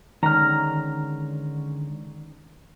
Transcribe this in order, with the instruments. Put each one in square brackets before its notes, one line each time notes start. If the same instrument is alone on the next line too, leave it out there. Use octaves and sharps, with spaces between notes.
[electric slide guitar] D3 G#3 C#4 [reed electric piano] D#3 [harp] A#5 F6